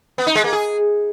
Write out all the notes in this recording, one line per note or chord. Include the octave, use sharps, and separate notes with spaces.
B3
D#4
G#3
A#3
G#4